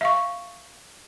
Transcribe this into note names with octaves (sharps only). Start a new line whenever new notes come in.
E5 F5 C#6